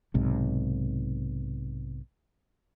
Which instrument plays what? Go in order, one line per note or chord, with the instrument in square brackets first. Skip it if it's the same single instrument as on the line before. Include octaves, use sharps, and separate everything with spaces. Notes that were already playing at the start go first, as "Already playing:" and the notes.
[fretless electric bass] B1 G#2 C3